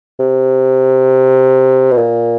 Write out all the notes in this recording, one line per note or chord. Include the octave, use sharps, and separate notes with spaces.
C3
B2
A#2